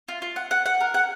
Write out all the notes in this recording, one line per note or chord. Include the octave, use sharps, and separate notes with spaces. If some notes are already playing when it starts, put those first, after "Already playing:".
F4
F4
F#5
F#5
F#5
A#4
F#5